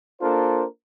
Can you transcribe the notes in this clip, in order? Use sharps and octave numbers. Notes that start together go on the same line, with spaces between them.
A#3 D4 F4 A4 A#4 C5